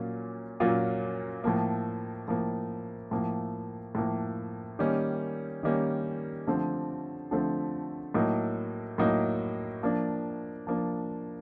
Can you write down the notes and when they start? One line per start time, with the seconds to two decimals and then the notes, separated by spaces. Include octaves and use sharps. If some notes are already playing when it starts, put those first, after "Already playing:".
Already playing: A#2 F#3 A#3 C#4 F4
0.60 A#2 F#3 A#3 C#4 F4
1.44 A2 F3 A#3
2.28 A2 F3 A#3
3.11 A2 F3 A#3
3.95 A2 F3 A#3
4.79 D#3 G3 A#3 C#4
5.63 D#3 G3 A#3 C#4
6.47 D3 F3 A3 C4
7.31 D3 F3 A3 C4
8.14 A2 F#3 A#3 D#4
8.98 A2 F#3 A#3 D#4
9.83 F3 A#3 D4
10.67 F3 A#3 D4